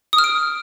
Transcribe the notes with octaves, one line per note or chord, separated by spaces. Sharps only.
D#6
F6
D7